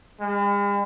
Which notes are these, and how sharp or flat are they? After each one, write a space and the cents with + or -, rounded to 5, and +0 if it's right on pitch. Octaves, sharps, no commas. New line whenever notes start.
G#3 -45